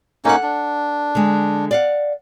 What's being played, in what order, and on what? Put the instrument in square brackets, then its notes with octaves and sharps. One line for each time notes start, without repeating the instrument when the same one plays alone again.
[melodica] A#3 C#4 D#4 [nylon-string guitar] A4 F#5
[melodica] D4
[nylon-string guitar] D3 G#3
D5 F5 F#5